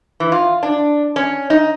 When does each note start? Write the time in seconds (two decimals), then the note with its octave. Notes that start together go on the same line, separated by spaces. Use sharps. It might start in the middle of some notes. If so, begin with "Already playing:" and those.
0.20 E3
0.32 F4
0.63 D4
1.16 C#4
1.50 D#4